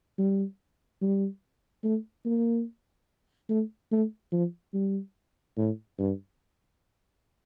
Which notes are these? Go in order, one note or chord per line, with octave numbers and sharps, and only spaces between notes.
G3
G3
A3
A#3
A3
A3
F3
G3
A2
G2